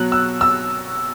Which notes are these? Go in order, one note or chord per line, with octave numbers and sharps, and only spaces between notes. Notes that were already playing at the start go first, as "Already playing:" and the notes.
Already playing: B2 F#3 F#6
E6
E6